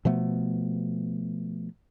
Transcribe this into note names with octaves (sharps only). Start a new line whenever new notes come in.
B2 F3 A3 B3